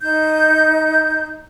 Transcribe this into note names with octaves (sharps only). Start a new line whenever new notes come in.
D#4 G6